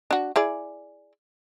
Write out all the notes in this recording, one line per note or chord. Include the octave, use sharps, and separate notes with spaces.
D4 F#4
E4 G#4 D5